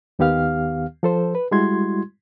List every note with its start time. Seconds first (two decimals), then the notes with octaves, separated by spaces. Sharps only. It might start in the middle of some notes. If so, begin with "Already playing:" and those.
0.19 D#2 D#3 B3 G4 F5 F6
1.03 F3 A4 C5
1.35 B4
1.51 G3 G#3 E4 F#4 C6 G#6